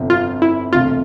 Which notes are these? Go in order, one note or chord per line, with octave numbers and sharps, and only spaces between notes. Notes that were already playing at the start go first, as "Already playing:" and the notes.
Already playing: G1 F2 C3
F4
E4
E1 D2 C3 F4